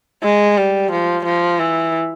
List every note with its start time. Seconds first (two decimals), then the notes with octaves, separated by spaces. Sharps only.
0.23 G#3
0.57 G3
0.91 F3
1.24 F3
1.59 E3